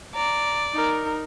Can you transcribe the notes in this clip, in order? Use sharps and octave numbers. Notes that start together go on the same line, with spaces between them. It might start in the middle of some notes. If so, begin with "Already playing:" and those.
D5 A#5
D#4 A#4